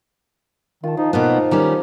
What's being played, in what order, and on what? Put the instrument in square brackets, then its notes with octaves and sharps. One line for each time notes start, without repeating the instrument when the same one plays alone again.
[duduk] D#3 [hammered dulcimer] F4 A5
[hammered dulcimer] F3 [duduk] D#4
[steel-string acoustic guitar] B2 A#3 B3 [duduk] D#4
[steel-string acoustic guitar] D#3 G3 C#4 [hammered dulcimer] A#5 D6